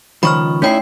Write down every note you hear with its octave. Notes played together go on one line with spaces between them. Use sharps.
C#2 D#3 F3 B5 C#6 F6
A3 C#4 D#4 E4 G5 C7